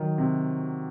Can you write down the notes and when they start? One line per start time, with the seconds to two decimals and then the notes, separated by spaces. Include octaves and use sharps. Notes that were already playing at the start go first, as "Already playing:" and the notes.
Already playing: D#3 F#3
0.18 C3